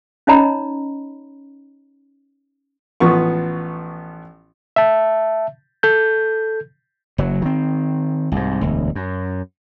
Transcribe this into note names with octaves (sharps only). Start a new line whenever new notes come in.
C#4 D#4 C#5 D#5 A#5 B5
A1 F3 B3 C#6
E5 A5
A4 G6
F#1 F#3
D#3 C4
C2 G#2
E1 D2
F#2